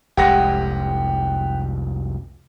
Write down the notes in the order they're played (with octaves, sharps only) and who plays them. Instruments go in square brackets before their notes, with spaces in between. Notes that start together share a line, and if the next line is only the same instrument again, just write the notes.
[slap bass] F1 C2 G#3 [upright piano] G4 F#5 A#6